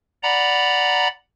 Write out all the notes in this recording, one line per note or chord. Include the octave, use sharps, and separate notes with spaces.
D5 F#5 A#5 B5